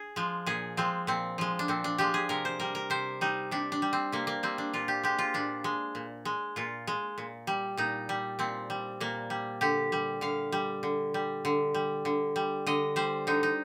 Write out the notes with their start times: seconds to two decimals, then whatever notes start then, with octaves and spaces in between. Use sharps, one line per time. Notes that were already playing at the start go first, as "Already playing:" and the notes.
Already playing: G#4
0.16 F3 G#3
0.46 A#2 G#4
0.77 F3 G#3 C4
1.07 A#2 C4
1.38 F3 G#3
1.59 D4
1.68 A#2 C4
1.84 D4
1.98 F3 G#3 G4
2.14 G#4
2.29 C3 A#4
2.45 C5
2.60 G3 A#4
2.75 A#4
2.90 C3 C5
3.21 G3 D#4
3.51 C3 D4
3.72 D4
3.82 G3
3.93 C4
4.12 C3 A#3
4.27 A#3
4.43 G3 C4
4.58 D4
4.74 A#2 F4
4.88 G4
5.03 G#3 G4
5.19 F4
5.34 A#2 D4
5.64 G#3
5.95 A#2
6.25 G#3
6.56 A#2 F4
6.87 G#3
7.18 A#2
7.47 G3
7.77 A#2 D#4
8.09 G3
8.39 A#2 C4
8.70 G3
9.00 A#2 A#3
9.30 G3
9.61 D3 G4
9.92 G3
10.21 D3 F5
10.52 G3
10.83 D3
11.14 G3
11.45 D3
11.74 G3
12.05 D3
12.36 G3
12.67 D3 D#5
12.96 G3 C5
13.27 D3 D#4
13.43 D#4